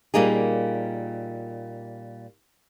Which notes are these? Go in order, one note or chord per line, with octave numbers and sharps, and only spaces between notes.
A#2 G3 A#3 D#4 G#4